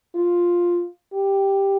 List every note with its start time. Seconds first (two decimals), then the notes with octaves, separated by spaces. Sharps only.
0.15 F4
1.14 G4